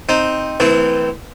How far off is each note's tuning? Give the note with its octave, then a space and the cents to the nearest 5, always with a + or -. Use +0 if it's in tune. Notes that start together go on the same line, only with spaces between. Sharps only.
C4 +0 D#4 +0
E3 -20 A3 +15 C4 -30